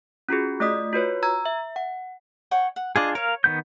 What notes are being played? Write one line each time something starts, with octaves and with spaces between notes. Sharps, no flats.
C#4 F4 F#4 G#4
A3 F4 D5 D#5 D#6 B6
F4 F#4 B4 C#5
A#5 E6 G#6
E5
F#5
C#5 F#5 G5
F#5
D4 F4 G#4 D#5 D6
A#4 C#5 F5
D#3 B3 G6